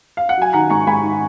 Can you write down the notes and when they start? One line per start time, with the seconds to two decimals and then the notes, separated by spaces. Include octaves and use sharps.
0.17 F5
0.29 F#5
0.37 F#3 G#5
0.53 D#3 F#5 A#5
0.70 G#2 A#5 C#6
0.87 G#2 G#5 B5
1.03 D#3